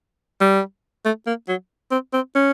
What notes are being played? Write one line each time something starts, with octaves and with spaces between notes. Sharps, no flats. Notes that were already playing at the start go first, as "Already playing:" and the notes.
G3
A3
A#3
F#3
C4
C4
C#4